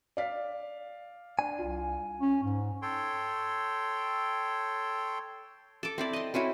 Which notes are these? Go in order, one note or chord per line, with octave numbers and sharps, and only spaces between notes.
D5 F5 B6
D4 G#5
C2 F4
C#4
G#2
A4 C#5 G5 C6
A4 D6
C4 E4 D5
D#5 C6
C4 C#4 E4 F#4